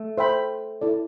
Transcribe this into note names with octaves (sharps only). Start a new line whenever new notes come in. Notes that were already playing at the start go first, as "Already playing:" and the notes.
Already playing: A3
C5 E5 G5 B5
E4 A4 D5